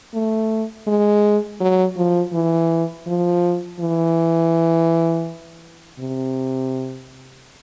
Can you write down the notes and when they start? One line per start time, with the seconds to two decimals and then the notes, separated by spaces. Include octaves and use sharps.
0.14 A3
0.87 G#3
1.60 F#3
1.97 F3
2.33 E3
3.07 F3
3.80 E3
5.99 C3